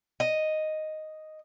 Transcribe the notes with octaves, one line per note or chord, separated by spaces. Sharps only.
D#5